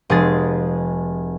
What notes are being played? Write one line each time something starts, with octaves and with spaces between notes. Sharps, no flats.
F1 G#3 G#4 A6